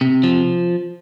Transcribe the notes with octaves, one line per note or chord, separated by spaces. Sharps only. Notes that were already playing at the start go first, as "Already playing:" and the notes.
C3
F3